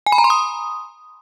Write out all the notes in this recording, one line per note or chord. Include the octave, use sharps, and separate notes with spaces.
G#5
B5
A#5
C6
D#6